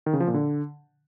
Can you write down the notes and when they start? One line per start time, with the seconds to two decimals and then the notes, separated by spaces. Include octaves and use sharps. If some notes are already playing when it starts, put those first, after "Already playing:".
0.06 D#3
0.13 C#3
0.20 F3
0.27 A#2
0.34 D3